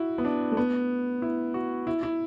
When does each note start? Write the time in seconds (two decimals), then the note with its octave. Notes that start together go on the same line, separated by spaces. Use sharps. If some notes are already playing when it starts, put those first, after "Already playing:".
Already playing: E4 F#4
0.18 B3
0.25 D4
0.52 A3
0.57 B3
1.22 E4
1.54 F#4
1.87 E4
2.03 E4